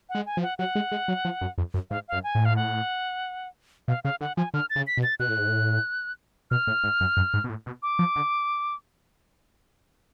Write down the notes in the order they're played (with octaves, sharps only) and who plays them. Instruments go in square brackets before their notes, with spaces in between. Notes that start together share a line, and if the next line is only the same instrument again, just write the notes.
[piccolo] F#5
[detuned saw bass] G#3
[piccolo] G#5
[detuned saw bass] F3
[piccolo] F#5
[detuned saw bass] F#3 [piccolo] F#5
[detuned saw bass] G#3
G#3
F#3
F3
F#2
F2
F#2
[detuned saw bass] G#2 [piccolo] F5
[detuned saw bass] F#2 [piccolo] F5
[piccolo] G#5
[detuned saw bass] A2
[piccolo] F5
F#5
[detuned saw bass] B2 [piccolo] F5
[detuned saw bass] C#3 [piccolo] F5
[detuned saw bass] D3 [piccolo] F#5
[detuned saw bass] F3 [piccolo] G#5
[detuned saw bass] D3 [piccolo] F6
[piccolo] A6
[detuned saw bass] C#3
[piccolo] B6
[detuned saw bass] B2
[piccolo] A6
[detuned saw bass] B2 [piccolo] F#6
[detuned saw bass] A2
G#2
A2
[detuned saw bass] B2 [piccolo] F6
[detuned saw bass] A2
G#2
F#2
F#2
G#2
B2
A2
B2
[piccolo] D6
[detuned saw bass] F3
D3